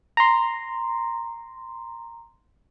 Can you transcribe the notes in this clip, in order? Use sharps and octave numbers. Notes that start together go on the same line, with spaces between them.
A#5 C6